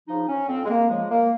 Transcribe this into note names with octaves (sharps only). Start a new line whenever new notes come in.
C#3 F3 D#4
C#4
F2 C4
G#3
A#3
C#3 F3 G#3
A#3